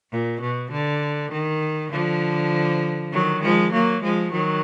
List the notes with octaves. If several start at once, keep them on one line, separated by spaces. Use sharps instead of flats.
A#2
B2
D3
D#3
D3 F3
D#3 F#3
F3 G#3
F#3 A#3
F3 G#3
D#3 F#3